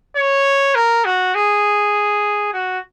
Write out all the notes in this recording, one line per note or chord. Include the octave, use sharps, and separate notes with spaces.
C#5
A#4
F#4
G#4
F#4